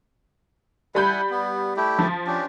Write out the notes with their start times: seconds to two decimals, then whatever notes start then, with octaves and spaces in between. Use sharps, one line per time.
0.95 G3 E4 F#5 G#5 B5 G6
1.30 B3
1.77 A3 E4 G4
1.99 F3
2.27 C#4 D4 G4